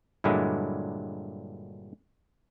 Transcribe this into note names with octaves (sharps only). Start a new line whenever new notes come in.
G2 A#2 D3 F#3 G#3 E4